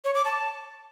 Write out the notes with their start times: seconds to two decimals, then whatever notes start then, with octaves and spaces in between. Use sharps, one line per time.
0.05 C#5
0.15 D6
0.25 A5